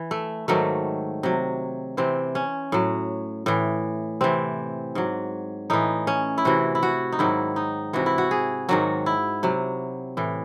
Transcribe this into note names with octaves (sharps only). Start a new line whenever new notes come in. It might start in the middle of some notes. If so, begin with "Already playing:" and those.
Already playing: E3
A3
G#2 D#3 F#3 A3
C3 F#3
C3 E3 C4
C#4
A2 F#3
A2 E3
C3 E3 C4
G#2 F#3
A2 E3 D#4
C#4
E4
C3 E3 F#4
E4
F#4
D#4
G#2 D#3 F#3 E4
D#4
C3 E3 F#4
E4
F#4
G#4
G#2 D#3 F#3 F#4
E4
C3 F#3
A2 E3